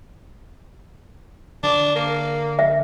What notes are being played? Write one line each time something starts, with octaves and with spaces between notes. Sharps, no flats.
D3 D4
A#3
E5